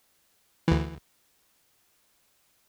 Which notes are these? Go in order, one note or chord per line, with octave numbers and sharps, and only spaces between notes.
D2 E3